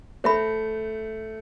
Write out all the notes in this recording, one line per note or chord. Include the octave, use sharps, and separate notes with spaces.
A3 C5 E5 B5